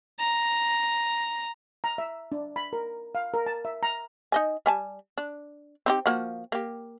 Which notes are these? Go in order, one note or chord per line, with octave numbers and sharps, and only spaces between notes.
A#5
A#5
E5
D4
B5
A#4
F5
A#4
A5
E5
A#5
D#4 D#5 G#5
G3 G#5 A5
D4
C4 D#4 G4
F3 A#3 F#4
A#3 G4